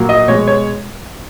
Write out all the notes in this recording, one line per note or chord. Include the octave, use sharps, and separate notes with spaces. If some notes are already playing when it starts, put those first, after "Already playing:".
Already playing: A#2 F#3 A#3
D#5
B2 G#3 C#5
C#5